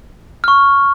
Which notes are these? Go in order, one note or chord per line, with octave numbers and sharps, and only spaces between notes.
C#6 F6